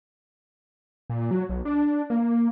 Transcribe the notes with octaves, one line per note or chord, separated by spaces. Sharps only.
A#2
F#3
B1
D4
A#3